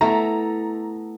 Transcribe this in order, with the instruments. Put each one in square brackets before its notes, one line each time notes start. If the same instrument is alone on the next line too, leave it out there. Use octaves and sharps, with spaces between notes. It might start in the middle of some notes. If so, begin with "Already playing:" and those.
[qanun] A3 B3 E4 [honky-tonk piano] A#5